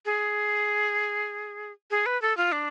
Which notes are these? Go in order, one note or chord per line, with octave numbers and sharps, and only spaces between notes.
G#4
G#4
B4
A4
F4
D4